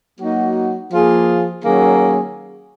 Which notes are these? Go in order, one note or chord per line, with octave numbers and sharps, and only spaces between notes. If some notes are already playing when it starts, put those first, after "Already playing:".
F#3 A#3 D#4 F#4
F3 A#3 F4 G#4
D#3 F#3 A#3 C#4 G#4